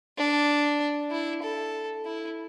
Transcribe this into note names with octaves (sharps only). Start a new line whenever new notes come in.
D4
E4
A4
E4